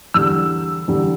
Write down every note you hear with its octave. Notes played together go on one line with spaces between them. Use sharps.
E2 D3 G3 E6
E2 D3 G3